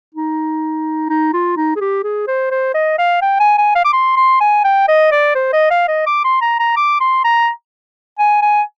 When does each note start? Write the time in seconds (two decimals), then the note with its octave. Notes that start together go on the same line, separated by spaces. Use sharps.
0.15 D#4
1.10 D#4
1.33 F4
1.57 D#4
1.76 G#4
1.81 G4
2.04 G#4
2.28 C5
2.51 C5
2.74 D#5
2.98 F5
3.22 G5
3.40 G#5
3.58 G#5
3.76 F5
3.85 D6
3.93 C6
4.17 C6
4.41 G#5
4.64 G5
4.88 D#5
5.12 D5
5.35 C5
5.53 D#5
5.71 F5
5.88 D#5
6.07 D6
6.24 C6
6.41 A#5
6.59 A#5
6.77 D6
7.01 C6
7.24 A#5
8.19 G#5
8.42 G#5